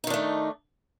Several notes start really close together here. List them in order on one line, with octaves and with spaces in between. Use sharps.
D#4 D#3 D4 A3